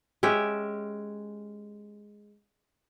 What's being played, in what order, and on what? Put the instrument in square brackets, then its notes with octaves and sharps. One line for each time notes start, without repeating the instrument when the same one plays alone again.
[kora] G#3 C#4 G4 E5